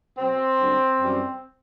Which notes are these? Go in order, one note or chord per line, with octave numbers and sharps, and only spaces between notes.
B2 F#3 C4
F#2 D3 G3
F#2 E3 G3